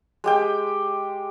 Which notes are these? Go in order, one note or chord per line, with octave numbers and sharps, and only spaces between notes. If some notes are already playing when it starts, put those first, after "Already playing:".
G#3 G4 G5